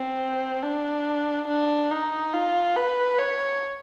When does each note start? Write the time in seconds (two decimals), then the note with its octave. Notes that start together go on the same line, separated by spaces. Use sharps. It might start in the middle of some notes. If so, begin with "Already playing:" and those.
Already playing: C4
0.63 D4
1.48 D4
1.91 D#4
2.33 F4
2.76 B4
3.19 C#5